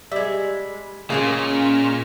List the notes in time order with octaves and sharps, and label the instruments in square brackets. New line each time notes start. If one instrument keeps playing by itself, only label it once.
[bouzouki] G3 G#3 [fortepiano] E5
[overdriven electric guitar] A#2 [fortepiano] C#3 [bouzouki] G#3 A#3 F4 [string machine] C#4 C#6 F6